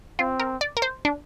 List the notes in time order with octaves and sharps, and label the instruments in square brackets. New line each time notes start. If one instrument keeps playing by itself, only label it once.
[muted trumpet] C4 [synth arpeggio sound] F4
[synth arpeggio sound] A#4
D5
A#4
C5
D4